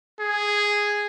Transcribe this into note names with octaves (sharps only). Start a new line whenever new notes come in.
G#4